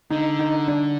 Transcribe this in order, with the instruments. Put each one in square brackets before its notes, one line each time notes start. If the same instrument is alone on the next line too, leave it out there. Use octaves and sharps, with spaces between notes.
[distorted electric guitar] D3 [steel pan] D#4
[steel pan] D#4
D4